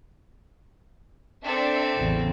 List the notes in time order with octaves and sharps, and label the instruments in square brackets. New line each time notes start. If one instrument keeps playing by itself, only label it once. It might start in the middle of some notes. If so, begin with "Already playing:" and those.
[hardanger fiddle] C4 A4 [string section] D4 E5
[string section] A1 E2 C#3